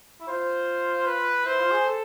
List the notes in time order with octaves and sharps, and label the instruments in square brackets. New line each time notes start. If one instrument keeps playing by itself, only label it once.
[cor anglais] E4
[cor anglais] F4 [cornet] C5
[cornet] B4
[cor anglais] E4 [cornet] C5
[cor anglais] F4
G#4
A4